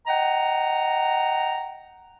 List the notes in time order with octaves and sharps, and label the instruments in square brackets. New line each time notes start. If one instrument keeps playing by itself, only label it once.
[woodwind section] D#5 F#5 G5 A#5